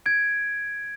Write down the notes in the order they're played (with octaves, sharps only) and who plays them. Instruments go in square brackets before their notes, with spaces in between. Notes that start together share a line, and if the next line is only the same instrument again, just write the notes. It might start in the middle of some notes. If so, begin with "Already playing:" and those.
[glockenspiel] G#6 D7